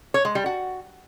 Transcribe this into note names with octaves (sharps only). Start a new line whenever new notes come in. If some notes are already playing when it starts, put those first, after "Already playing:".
C#5
G#3
G3
F#4